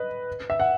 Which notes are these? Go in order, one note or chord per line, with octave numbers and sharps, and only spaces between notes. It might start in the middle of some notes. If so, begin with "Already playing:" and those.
Already playing: B4 D#5
E5
F#5